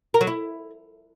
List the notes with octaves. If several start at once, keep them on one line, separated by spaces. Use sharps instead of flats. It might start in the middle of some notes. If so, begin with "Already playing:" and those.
A#4
F#3
E4